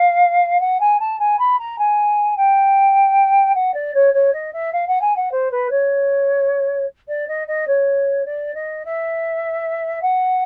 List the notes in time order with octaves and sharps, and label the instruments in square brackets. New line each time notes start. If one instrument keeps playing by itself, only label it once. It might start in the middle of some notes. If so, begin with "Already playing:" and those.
Already playing: [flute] F5
F#5
G#5
A5
G#5
B5
A#5
G#5
G5
F#5
D5
C#5
C#5
D#5
E5
F5
F#5
G#5
F#5
C5
B4
C#5
D5
D#5
D#5
C#5
D5
D#5
E5
F#5